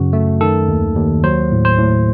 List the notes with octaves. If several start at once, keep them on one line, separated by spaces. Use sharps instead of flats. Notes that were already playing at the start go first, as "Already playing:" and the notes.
Already playing: F#2 C#3 F#4
A3
D#3 A4
D#2
D#2
F#3 C5
A2
C5
A2